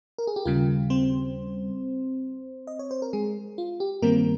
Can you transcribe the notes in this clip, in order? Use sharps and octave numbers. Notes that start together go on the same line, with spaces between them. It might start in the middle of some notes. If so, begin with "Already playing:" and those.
A#4
G#4
G4
D#2 C#3 G3 F4
C4 C5
D#5
C#5
C5
A#4
G#3 G#4
F4
G4
G2 D#3 G3 A#3 C4 A#4